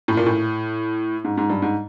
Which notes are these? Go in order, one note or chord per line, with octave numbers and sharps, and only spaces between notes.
A2
A#2
A2
G#2
G#2
G2
G#2